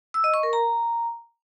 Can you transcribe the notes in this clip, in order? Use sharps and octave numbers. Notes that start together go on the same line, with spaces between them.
E6
D#5
C#6
A#4
A#5